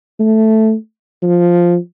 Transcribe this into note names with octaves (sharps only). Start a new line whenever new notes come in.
A3
F3